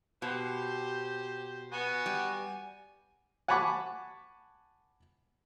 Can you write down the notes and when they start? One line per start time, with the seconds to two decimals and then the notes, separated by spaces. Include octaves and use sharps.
0.22 B2 G4 C5
1.72 B3 F#4 G#5
2.06 G3
3.48 F#5 G#5 A5 B5 C#6 D6